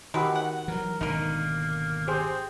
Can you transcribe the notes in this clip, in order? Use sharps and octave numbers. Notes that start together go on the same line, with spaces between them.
D#3 G#3 F#4 G4 B4
F#5
E3 F#3 A#4
G#1 B2 D3 A#3 D#4 A#4
C4 G4 G#4 C5